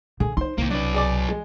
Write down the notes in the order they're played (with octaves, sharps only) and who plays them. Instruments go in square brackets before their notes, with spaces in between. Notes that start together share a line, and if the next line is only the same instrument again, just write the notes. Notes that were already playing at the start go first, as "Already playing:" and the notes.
[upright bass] D3 [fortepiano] G#4
[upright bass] D#4 [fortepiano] C5 C6
[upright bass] C2 [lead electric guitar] D#3 A#3
[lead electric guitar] F#3 B4 [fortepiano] D4
[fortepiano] G#4 D5 D6
G#3